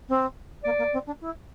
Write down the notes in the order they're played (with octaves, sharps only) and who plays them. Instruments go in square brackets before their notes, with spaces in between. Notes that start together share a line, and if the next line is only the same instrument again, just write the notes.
[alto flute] C4
[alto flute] A#3 [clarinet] D5
[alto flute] A#3
C4
D4
E4